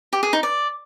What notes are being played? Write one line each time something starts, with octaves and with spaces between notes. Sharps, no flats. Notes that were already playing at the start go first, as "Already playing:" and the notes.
G4
G#4
D#4
D5